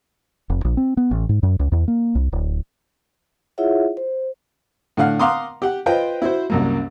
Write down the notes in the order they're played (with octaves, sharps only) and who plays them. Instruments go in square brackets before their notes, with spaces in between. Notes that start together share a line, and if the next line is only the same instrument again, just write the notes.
[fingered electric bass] F1
A#1
C4
B3
A1
G#2
F#2
C#2
E2
A#3
C2
D1
[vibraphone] E4 F4 G#4 C#5 E5 F#5
C5
[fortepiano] A2 D3 F5 F#5 F6
F5 F#5 A#5 C6 D6 D#6
G4 F#5
F4 B4 C5 D#5 G5
E4 F#4 C5
C2 F#2 A#3